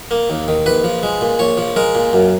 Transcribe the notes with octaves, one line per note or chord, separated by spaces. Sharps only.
A#3
D#2
D#3
A#1 B4
F3
G#3
A#2
A#1 C#5
F3
G#3 A#4
A#2
F#2